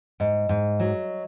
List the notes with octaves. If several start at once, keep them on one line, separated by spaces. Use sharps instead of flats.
G#2 D#5
G#2
F#3